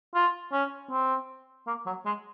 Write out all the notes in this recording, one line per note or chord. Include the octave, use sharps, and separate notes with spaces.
F4
C#4
C4
A#3
F#3
G#3